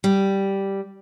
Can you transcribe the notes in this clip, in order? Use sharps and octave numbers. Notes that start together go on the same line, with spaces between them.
G3